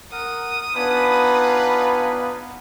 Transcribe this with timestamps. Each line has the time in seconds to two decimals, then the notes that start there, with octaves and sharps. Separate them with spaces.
0.12 A#4 F#5 D#6
0.75 B3 D4 D#4 F4 B4 G#5 B5